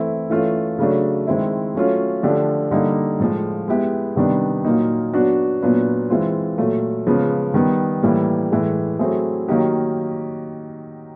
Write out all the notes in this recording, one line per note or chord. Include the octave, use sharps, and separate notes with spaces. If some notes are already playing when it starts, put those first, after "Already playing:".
Already playing: E3 A3 C4 E4
E3 A3 C#4 F4
C#3 F#3 A3 D4
D#3 G#3 C4 E4
F#3 A3 C#4 F4
D3 F3 A3 D4 G4
D3 G3 A#3 D#4
A2 F3 G#3
G#3 B3 E4 G4
C3 D#3 G3 B3 D4
A#2 F#3 A#3 D#4
F#3 B3 D4 F#4
A#2 F#3 B3 D4
E3 G#3 C4 F4
A#2 F#3 A3
C#3 F3 G#3 B3
D#3 G3 B3
A2 E3 G3 A#3
A2 E3 G#3
F#3 A3 C4 E4 G#4
D#3 F#3 A#3 D#4 G4